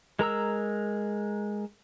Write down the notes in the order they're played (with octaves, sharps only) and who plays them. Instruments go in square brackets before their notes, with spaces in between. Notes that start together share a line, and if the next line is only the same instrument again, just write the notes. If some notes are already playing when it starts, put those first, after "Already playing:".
[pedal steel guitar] G#3 A#4 A#5 E6